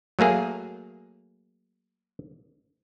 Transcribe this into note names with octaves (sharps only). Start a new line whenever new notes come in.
F#3 A3 A#3 G#4